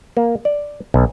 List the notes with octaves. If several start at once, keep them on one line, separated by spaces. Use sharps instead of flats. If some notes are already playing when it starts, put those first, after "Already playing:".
A#3
D5
B1